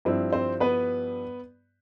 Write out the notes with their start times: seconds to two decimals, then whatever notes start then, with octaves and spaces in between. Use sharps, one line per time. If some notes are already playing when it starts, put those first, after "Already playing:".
0.05 G2 F3 C4 E4
0.33 C4 C5
0.60 B3 B4